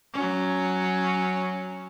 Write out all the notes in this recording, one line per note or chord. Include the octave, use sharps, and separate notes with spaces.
F#3 C#4